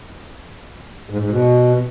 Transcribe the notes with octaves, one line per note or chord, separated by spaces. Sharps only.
G#2
G#2
B2